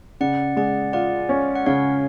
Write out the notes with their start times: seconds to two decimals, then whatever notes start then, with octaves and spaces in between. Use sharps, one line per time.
0.21 C#3 D5 F#5
0.56 G#3 D5 F#5
0.93 F4 D5 F#5
1.29 C#4
1.55 F#5
1.66 C#3 C#5 F5